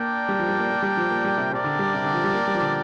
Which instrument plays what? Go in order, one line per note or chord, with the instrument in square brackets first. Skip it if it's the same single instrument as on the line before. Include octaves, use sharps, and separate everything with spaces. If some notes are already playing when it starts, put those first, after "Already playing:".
Already playing: [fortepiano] A#3 [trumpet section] D4 A#4 D5 G5
[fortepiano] G3
F3
G3
A#3
A#3
G3
F3
A#3
G3
C3
[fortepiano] C3 [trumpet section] D4 A#4 D5 G5
[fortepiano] D3
G3
C3
D3
F3
G3
A#3
G3
F3
D3